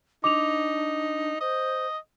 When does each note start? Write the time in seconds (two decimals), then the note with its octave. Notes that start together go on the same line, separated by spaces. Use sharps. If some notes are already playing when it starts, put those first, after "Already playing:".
0.24 D4 D#4 D6 F7
1.40 C5 D#5